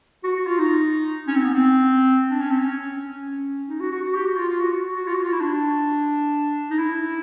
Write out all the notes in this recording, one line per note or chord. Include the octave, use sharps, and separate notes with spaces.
F#4
F#4
F4
D#4
C#4
C4
B3
C4
D4
C#4
C4
C#4
D#4
F#4
F#4
F#4
G4
F#4
F4
F4
F#4
F#4
F#4
F4
F#4
F4
E4
D4
D#4
E4